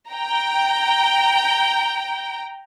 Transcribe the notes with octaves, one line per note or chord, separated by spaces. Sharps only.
G5 A#5